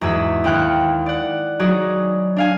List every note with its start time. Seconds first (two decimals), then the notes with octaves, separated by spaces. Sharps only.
0.01 E2 G#2 F#4 G#4 E6 B6
0.44 D#2 E4 G5 F6 F#6 C#7
1.06 D5 F#5
1.59 F#3 D#4 F#4 G#4 D5 D#5
2.37 D4 F5 G#5